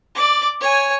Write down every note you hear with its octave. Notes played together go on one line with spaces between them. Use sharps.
D5 D6
C#5 G#5